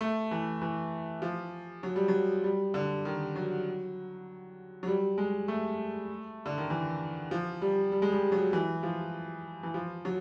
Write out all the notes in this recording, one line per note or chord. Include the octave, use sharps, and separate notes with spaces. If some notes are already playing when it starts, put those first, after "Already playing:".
A3
E3
E3
F3
F#3
G3
F#3
G3
D3
D#3
F#3
F#3
G3
G#3
A3
D3
D#3
E3
F3
G3
G3
G#3
G3
F#3
E3
F3
E3
F3
F#3